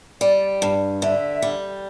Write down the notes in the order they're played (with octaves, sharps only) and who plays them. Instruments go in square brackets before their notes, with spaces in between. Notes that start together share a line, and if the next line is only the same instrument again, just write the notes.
[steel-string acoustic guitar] G3 [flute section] D5
[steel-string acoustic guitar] G2
[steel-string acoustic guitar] D3 [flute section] E5
[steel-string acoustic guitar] G3